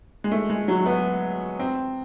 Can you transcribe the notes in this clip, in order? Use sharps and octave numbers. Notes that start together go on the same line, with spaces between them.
G#3
A3
G#3
F#3
B3
C4